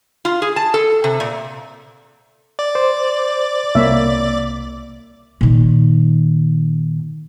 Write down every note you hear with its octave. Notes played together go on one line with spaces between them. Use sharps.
F4
G#4
A5
A4
C3
A#2
D5
C5 D6
C2 A#3 C#5 E5
A#2 D#3